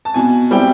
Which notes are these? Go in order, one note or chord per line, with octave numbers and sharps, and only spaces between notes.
A5
B2 G#5
G3 C4 E4 G5